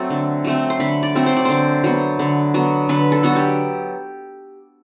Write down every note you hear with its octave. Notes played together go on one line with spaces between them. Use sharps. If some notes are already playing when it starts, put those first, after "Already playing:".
Already playing: F#3 A3 C4 A5
D3
F#3 A3 C4
C6
D3 B5
D5
F#3 A3 C4
C5
D5
D3 C5
F#3 B3
D3
F#3 B3
D3 B4
A4
F#3 B3 F#4
G4